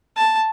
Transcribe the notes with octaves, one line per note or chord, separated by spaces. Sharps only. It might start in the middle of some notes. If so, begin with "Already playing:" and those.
A5